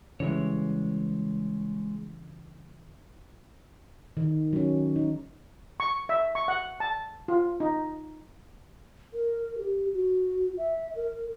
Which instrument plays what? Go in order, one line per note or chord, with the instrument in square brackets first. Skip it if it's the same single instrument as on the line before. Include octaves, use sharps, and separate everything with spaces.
[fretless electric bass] C#3 E3 G3 [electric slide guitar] G#3 C#5
[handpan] D#3
F#3 C#4
D#4
[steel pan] C#6
E5
C#6
F#5
A5
F4
D#4
[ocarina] A#4
G4
F#4
E5
A#4